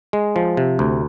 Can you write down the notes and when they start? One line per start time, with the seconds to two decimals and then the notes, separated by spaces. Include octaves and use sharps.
0.13 G#3
0.36 F3
0.57 C3
0.79 D2